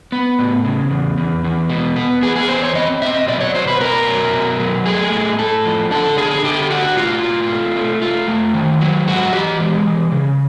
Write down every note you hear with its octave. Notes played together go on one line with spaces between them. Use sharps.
B3
A2
C#3
E2
E2
E2
B2
B3
B3 G#4
G#4
E2 C5
C#5
C4 D#5
B2 E5
D#5
F#3 D5
C#5
B2 C5
B4
B2 A#4
F#3
B2
F#3
A3 G#4
A2
A2 A4
F3
D4 A4
D3 G#4
D3 G4
D4 F#4
A2 F4
A2
A3
A3
A3 F4
A3
D#3
F#3
G#2 F#4
E3 G4
G#3
E3
C#3